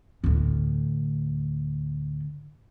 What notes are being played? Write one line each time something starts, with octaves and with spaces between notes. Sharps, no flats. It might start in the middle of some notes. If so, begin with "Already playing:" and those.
D2 A2